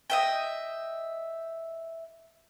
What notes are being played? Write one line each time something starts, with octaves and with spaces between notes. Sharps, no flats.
D#5 E5 G5